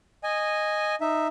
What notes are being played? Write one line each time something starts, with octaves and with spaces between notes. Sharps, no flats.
D#5 G#5
D#4 E5